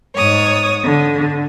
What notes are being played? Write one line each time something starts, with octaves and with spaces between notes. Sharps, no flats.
G#2 C#5 D#6
D3